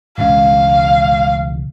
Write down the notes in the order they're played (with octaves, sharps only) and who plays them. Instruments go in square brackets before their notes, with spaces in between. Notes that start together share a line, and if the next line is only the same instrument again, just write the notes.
[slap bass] E1 C#2 C#4 [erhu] F5